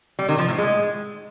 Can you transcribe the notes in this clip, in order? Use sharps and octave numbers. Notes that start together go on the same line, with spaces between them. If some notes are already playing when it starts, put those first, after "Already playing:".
G3
D#3
F3
A2
G#3